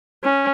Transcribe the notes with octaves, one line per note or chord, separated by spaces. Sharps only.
C#4